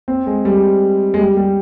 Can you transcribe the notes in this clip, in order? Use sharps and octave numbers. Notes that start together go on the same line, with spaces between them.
C4
G#3
G3
G#3
G3
G3